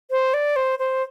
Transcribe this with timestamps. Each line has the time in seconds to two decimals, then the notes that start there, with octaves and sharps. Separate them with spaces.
0.11 C5
0.34 D5
0.56 C5
0.79 C5